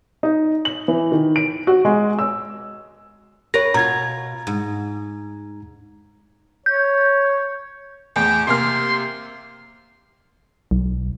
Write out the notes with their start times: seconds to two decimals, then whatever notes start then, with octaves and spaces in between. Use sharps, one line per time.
0.23 D#4
0.65 F#7
0.88 E3
1.12 D#3
1.36 D7
1.67 F#4
1.85 G#3
2.19 E6
3.54 A#4 B4 C#5 A#6
3.74 B2 F4 A#5 G#6
4.47 G#2
6.66 C#5 G6
8.16 E2 A2 G5
8.47 C3 A#3 C6 F6
10.71 B1